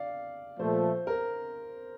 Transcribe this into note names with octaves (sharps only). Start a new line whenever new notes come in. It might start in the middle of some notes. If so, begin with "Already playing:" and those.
Already playing: D5 F5
A#2 F3 A3 C5
A#4